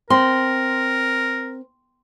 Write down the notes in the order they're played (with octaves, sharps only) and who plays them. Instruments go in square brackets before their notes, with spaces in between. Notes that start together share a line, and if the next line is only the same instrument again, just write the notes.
[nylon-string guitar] C4 [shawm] A#4 [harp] C6